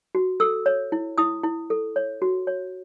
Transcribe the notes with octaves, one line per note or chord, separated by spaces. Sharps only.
F#4
A4 E6
C#5
E4
E4 D#6
E4
A4
C#5
F#4
C#5